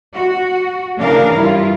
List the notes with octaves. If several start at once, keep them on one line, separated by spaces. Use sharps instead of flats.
F#4
C#3 E3 D4 A#4 F5
G2 E4 F4